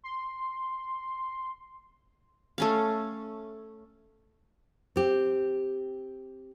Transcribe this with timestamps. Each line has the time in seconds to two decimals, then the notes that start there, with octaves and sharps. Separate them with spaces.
0.04 C6
2.58 A3 C#4 F5
4.96 C4 G4